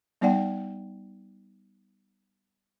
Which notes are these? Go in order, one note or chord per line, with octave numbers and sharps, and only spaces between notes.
G3 B3 D#4 D5 F#5 G5